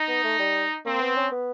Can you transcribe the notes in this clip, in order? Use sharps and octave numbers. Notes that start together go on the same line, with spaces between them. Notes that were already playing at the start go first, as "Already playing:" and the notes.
Already playing: D#4
B3
A3
G3
A#3 C4
B3
C#4
B3